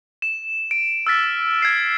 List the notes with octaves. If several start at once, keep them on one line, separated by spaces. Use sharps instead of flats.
E7
D7
E6 F6 A6 B6
G#6 C7